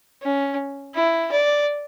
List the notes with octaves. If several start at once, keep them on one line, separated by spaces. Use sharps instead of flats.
C#4
E4
D5